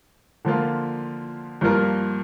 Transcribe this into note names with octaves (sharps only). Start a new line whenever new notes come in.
D3 F3 A#3 F4
G2 F3 A#3 F4 A#4